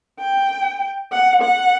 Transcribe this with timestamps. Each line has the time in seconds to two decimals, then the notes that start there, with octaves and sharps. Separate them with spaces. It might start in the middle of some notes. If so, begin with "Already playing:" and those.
0.20 G5
1.12 F#5
1.42 F#5